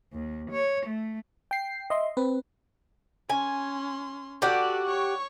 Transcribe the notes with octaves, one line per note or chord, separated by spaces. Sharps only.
D#2
C#5
A3
G5 C7
D#5 E5 C6
C4 B4
C#4 G#5 C6
F#4 G4 A4 D5 F#5
C#5 C#6